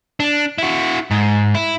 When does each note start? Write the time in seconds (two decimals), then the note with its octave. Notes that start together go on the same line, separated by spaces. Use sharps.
0.20 D4
0.58 E4 F#4
1.11 G#2
1.55 E4